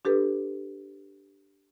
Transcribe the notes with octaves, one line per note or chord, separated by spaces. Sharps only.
D4 G4 A4 B4